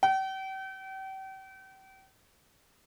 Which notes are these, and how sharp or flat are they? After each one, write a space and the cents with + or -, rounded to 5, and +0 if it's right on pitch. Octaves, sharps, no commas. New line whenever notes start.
G5 -40